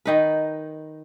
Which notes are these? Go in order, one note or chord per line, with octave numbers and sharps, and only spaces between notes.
D#3 D#4 B4